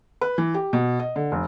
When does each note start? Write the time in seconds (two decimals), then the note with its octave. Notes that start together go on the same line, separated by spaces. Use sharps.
0.21 B4
0.38 E3
0.54 G4
0.73 B2
1.00 D#5
1.16 D3
1.32 F1